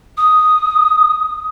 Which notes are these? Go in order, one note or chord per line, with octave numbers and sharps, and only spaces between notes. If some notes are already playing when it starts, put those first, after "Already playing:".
D#6